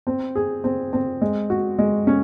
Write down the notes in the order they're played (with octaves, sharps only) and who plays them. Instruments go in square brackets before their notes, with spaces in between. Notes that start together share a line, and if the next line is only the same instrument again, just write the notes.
[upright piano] C4
G#4
C4
C4
G#3
F#4
G#3
C#4